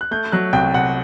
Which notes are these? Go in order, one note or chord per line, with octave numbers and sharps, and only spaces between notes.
F#6
A3 G6
F#3 F#6
C2 G5
C2 F#5